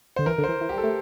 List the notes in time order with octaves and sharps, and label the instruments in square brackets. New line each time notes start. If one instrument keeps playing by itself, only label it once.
[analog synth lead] D3 [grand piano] C5
[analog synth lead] E3 [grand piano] A#4
[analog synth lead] D3
[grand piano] C5
[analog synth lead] E3
E3
[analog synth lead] G3 [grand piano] G4
[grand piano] A4
[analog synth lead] A3